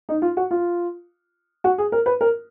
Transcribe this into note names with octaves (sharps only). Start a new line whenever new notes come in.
D#4
F4
F#4
F4
F#4
G#4
A#4
B4
A#4